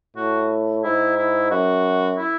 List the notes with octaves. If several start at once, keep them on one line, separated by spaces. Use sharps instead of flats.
A2 F#4
G#2 E4
E4
F#2 F#4
E4